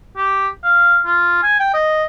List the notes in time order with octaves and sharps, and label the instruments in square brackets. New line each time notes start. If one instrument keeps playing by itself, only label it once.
[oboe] G4
F5
F4
G#5
G5
D#5